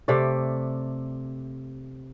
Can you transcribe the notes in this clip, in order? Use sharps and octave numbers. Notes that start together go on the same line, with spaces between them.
C3 A3 D5